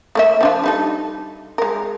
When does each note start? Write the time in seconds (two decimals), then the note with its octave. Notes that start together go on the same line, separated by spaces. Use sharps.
0.15 A3 A#3 E5
0.41 F3 D4 F4
0.63 G3 D#4 A4
1.58 G#3 A#4